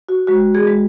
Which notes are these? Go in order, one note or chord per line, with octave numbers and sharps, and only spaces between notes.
F#4
G#3 F#4
G#4
G#3